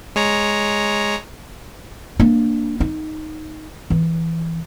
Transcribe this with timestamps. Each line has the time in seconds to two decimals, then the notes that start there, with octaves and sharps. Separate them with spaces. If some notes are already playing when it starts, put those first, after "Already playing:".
0.16 G#3 C#5 A#5
2.20 A#3 D4
2.80 D#4
3.90 E3